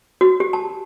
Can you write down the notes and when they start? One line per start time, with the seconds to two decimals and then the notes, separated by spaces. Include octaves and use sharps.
0.21 F#4
0.40 G4
0.53 A5